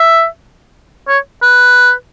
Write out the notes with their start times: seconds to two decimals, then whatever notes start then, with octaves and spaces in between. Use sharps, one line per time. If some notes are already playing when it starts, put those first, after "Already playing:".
Already playing: E5
1.08 C#5
1.42 B4